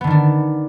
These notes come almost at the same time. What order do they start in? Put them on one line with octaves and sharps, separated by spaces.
B3 D3 D#3 D4